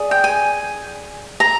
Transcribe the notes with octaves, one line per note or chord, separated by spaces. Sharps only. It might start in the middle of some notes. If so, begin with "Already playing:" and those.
Already playing: G#4 D5
G5
G#5
A#5